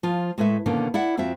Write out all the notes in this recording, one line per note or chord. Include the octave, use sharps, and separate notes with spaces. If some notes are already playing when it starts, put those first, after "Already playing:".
F3 F4
A2 G#3 A3 B4 E5
B2 D3 D#3 A#3 B3 C#4
E4 D5 E5 F#5
F2 C4 F4 F#4 E5